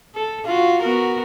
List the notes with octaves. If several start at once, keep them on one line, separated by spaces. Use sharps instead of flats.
A4
F4 F#4
B3 F#4 A#4